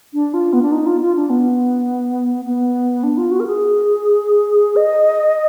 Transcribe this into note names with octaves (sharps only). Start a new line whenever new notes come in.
D4
F4
B3
D4
D#4
F4
F4
D4
B3
B3
D4
F4
F#4
A#4
G#4
D#5